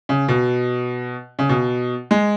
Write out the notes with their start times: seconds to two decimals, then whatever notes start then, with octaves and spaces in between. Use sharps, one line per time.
0.09 C#3
0.28 B2
1.39 C#3
1.49 B2
2.11 G#3